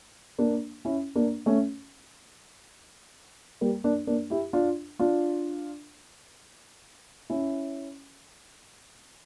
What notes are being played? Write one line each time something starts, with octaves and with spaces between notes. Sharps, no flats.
A#3 D4
C#4 E4
A#3 D4
A3 C#4
G3 A#3
A#3 D4
A#3 D4
E4 G4
D4 F4
D4 F4
C#4 E4